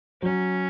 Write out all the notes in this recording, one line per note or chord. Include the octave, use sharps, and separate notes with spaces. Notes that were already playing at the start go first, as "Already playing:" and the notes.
F#3 C#4